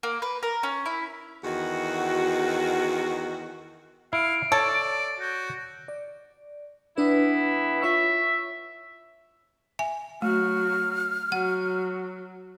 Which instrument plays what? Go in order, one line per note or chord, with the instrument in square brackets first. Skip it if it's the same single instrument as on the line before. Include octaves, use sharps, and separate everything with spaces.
[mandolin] A#3
B4
A#4
C#4
E4
[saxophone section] E2 D#3 F#4
[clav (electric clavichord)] E4 [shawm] F5 [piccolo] D7
[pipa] A4 [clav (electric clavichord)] C#5 [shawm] D5
[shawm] F#4 [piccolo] G6
[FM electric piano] D5
[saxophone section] E3 B3 E4 [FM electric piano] D4 B4
[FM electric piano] F4 C#5 C#6 [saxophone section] E5
[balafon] E5 G#5
[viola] F#3 F#4 [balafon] A3 [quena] F6
[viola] F#3 [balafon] F#5